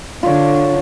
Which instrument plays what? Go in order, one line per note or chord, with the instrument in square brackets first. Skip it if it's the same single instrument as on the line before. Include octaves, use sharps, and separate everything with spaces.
[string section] D3 [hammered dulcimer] F4 C#5